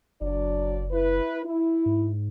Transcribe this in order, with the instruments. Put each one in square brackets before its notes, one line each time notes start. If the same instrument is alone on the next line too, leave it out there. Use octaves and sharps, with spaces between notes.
[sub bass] F#1 [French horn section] F#3 D4 D5
[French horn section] E4 B4
E4
[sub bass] G#2